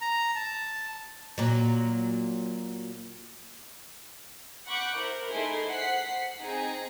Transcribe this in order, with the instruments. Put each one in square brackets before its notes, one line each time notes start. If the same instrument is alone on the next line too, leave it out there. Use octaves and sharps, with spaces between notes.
[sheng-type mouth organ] A#5
A5
[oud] A#2 F#3
[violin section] F#5 B5 C#6 D6 F#6 G6
E4 A#4 C5
A3 D#4 E4 G#4 C6
C5 F#5 B6 C7
C4 D#4 G#4